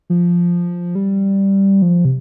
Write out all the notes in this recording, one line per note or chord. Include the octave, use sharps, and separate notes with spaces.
F3
G3
F3
C3